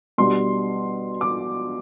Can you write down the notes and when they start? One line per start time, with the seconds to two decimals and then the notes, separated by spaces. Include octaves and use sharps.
0.18 B2 G3 D4 C6
1.21 D6